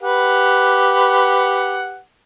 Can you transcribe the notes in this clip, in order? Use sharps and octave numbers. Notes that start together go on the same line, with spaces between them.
G4 B4 F#5